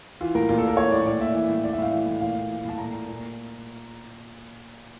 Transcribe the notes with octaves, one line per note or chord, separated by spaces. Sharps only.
E3 F4
A2 A#4
A#2 F4
A4
A#2 A#4
E3 C#5
A2 D5
A#2 D5
A#2 E5
E3
A2
E3 D5
E5
A2 F5
E3
A2
A#2 F5
A#2
E3
A2 A5
A#2 A#5
A#2
A#2